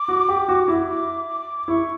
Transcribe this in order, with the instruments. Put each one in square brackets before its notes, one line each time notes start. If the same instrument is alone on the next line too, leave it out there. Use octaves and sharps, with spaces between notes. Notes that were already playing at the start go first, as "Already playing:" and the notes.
Already playing: [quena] D6
[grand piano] F#4
G4
F#4
E4
[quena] D6
D6
[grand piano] E4 [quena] C#6